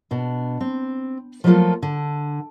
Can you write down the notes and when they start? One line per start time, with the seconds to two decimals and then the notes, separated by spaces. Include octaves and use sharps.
0.11 B2 D4
0.61 C4
1.44 F3 F#3 A3 A#3 F4 A4
1.82 D3